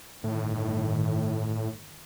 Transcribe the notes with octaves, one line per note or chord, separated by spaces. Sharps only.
G1 A2 D#3